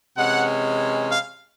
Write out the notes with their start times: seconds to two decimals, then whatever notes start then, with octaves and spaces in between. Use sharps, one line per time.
0.17 C3 E3 G#3 C#4 F#5
1.09 F5